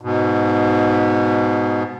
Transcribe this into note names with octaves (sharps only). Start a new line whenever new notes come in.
G#2 B2